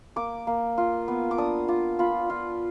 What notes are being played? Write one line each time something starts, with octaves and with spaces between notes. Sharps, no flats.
A#3 D6
A#3
F4
B3
D6
D4 D#6
F4 D6
F4 B5
F4